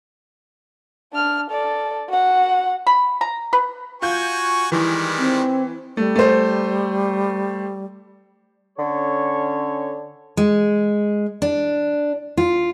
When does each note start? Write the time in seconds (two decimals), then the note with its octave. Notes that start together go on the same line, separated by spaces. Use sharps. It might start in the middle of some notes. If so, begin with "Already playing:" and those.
1.12 D4 F6
1.50 A4 D5
2.09 F#4 F#5
2.87 B5
3.21 A#5
3.53 B4
4.02 F4 F#4 G#5 C#6 G6
4.72 D#3 E3 G3 G#3
5.18 C4
5.97 G3 A3
6.16 A3 C5
8.79 D3 C#4 A4 C#5
10.37 G#3
11.42 D4
12.37 F4